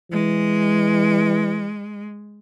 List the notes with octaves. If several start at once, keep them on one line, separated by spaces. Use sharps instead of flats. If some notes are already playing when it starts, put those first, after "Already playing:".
E3 G#3